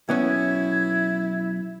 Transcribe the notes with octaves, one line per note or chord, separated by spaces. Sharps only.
B1 B3 C#4 E4 G#6